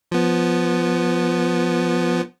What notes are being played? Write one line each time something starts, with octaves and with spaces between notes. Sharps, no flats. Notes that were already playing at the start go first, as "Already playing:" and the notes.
F3 B3